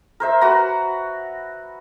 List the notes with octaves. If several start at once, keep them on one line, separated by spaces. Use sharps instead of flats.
A#4 C5 E5
F#4 B4 A#5